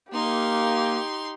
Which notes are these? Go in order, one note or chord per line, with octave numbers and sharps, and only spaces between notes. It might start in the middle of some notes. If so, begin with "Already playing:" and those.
A#3 D#4 G4 C6